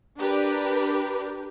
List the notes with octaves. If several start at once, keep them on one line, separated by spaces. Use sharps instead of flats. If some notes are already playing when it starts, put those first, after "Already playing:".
D4 G4 A#4 B4